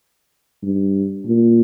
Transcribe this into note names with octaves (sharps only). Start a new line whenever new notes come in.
G2
A#2